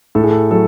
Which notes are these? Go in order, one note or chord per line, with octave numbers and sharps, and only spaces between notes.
A2 A4
G#4
A4
F#3 A4